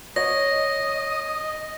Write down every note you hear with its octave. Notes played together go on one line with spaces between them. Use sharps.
C#5 D#5 D#6 A#6